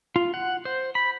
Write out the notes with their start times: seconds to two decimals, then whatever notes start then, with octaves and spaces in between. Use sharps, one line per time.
0.16 F4
0.34 F#5
0.65 C5
0.95 B5